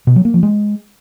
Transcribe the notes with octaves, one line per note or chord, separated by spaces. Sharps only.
B2
F#3
A#3
F3
G#3